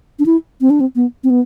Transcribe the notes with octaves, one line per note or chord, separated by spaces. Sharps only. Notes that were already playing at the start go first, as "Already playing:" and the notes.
D4
E4
C4
D4
C4
B3
C4
B3